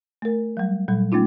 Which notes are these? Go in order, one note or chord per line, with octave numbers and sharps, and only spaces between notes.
A3 A#4
F#3 G3
A#2 F#3 G3
G#3 A3 C#4 D#4 F4